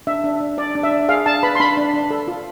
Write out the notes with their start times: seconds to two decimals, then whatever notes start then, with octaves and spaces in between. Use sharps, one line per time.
0.07 D4 E5
0.24 D4
0.41 D4
0.57 D4 D5
0.75 D4
0.83 E5
0.92 D4
1.08 G#4 F5
1.26 D4 A5
1.43 B4 B5
1.55 C6
1.60 D4 B5
1.77 D4
1.93 D4
2.11 A4
2.28 F4